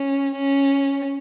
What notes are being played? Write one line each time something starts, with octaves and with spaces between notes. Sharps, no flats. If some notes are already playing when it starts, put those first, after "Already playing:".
Already playing: C#4
C#4